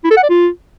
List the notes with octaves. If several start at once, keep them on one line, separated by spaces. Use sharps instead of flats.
E4
A4
F#5
D5
F4